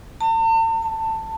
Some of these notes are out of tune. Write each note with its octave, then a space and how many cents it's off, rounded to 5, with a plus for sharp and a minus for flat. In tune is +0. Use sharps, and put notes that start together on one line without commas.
A5 +45
A5 +20